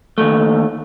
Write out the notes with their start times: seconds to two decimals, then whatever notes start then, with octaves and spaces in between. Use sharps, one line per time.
0.18 D#2 G#2 A3